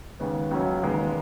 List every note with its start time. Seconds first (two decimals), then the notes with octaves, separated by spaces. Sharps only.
0.20 D#2 C#3 G#3 B3
0.51 C#2 C#3 F#3 C#4 F#4
0.83 E1 D#2 C#3 G#3 B3